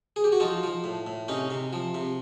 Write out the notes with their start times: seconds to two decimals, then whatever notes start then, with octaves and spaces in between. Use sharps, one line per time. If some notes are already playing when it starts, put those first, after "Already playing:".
0.16 G#4
0.24 G4
0.32 F#4
0.40 F3 D#4 F4
0.63 F3
0.84 A2
1.07 A2
1.28 C3 C#4 D#4
1.50 C3
1.73 F3
1.94 C3